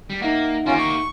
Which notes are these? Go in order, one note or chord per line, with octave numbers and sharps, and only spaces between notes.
G3
A#3 D#4 E5 F#5
A#3 C#4 F4 G4
C#6